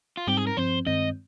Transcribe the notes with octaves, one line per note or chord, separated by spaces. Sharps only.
F4
G#2 G3 C4 D#4 G4
G#4
A#4
G2 F3 C4 C5
G2 D#3 G#3 C4 D#5